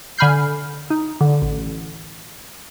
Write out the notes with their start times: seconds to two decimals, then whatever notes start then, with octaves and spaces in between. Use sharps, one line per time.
0.18 D3 G#5 B5 F6 G6 C7
0.90 D#4
1.21 D3
1.42 A1